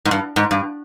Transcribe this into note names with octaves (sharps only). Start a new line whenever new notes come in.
G#2
G2
G#2
G2